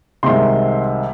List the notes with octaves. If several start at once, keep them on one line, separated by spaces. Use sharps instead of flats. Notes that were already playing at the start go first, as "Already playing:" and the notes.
C2 C3 D#3 G#3 C6